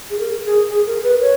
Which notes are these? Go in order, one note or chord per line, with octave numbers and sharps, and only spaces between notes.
G#4
A#4
G#4
G#4
A#4
B4
C#5